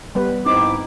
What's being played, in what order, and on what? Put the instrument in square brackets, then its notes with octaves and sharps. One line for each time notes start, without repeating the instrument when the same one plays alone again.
[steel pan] G3 B3 B4
[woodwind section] G#2 E4 D6 [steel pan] C4 D#4